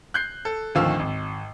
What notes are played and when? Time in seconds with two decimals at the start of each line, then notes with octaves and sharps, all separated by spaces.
0.14 F#6 G6 C7
0.45 A4
0.75 G#1 D2 D#3 F3 F5 E6
0.99 G#1